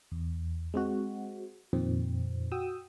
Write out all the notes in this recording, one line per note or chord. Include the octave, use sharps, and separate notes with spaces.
E2
G#3 C4 F#4
F2 A#2 D#3 C4
F#4 G5 D#6 E6